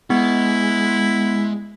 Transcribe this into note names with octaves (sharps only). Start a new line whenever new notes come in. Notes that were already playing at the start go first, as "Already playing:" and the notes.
G#3 B3 E4